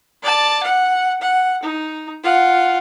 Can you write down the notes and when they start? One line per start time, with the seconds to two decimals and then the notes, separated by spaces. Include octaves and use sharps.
0.23 D5 A5
0.63 F#5
1.21 F#5
1.63 D#4
2.23 F4 F#5